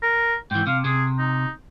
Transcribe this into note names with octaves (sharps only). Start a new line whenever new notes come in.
A#4
G#2 E3 G5
C3 F5
C3 G#4
D#4